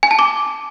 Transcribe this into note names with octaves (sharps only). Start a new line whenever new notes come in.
G#5
A5
D6